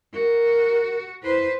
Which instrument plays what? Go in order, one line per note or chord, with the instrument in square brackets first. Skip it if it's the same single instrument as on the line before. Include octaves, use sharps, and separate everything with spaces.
[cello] F#4 [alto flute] A#4
[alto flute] E4 [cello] B4 C5